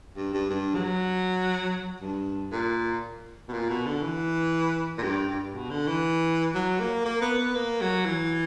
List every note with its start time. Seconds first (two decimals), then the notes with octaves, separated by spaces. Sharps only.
0.17 G2
0.34 G2
0.50 G2
0.75 F#3
2.00 G2
2.52 A#2
3.48 B2
3.53 A#2
3.69 B2
3.86 D3
4.02 E3
4.98 A#2
5.03 G2
5.29 G2
5.54 B2
5.70 D3
5.87 E3
6.55 F#3
6.80 A#3
7.05 A#3
7.21 B3
7.38 B3
7.55 A#3
7.81 F#3
8.05 E3